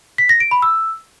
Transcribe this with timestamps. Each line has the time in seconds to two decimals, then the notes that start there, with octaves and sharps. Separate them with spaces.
0.18 B6
0.29 A#6
0.40 D7
0.51 B5
0.62 E6